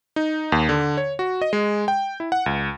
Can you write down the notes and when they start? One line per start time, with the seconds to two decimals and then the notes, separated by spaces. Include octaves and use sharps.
0.16 D#4
0.52 D#2
0.69 D3
0.97 C#5
1.19 F#4
1.42 D#5
1.53 G#3
1.88 G5
2.20 E4
2.32 F#5
2.46 C#2